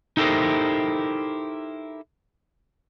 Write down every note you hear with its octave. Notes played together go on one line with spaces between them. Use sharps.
D#4 E4 G4 A4 A#4 C5